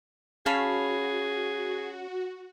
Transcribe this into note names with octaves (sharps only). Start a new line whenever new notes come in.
C#4 F#4 G#4 F5 A5 B5